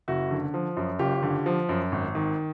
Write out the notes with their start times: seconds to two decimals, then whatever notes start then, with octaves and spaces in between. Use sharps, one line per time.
0.08 F#1 E4 F#4
0.31 D3
0.54 F3
0.77 F#2
0.99 F#1 F4 G4
1.23 D3
1.46 F3
1.69 F#2
1.92 G#1
2.15 D#3